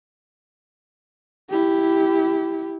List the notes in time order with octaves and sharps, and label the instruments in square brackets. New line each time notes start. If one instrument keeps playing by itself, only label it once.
[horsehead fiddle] E4 G4